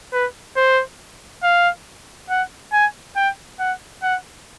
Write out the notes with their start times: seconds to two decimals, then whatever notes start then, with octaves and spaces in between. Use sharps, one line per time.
0.13 B4
0.56 C5
1.43 F5
2.30 F#5
2.73 G#5
3.16 G5
3.59 F#5
4.03 F#5